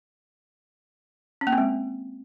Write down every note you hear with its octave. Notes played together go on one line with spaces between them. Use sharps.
C#4
A#3
C4
G#3